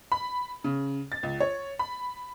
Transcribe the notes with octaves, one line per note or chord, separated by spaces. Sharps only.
B5
C#3
A6
C#2
C#5
B5